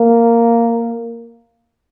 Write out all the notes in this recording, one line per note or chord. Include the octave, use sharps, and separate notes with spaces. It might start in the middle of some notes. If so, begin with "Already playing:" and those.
Already playing: A#3